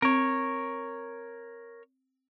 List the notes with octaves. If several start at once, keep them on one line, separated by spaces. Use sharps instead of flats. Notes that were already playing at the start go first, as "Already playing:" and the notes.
C4 A#4 C#5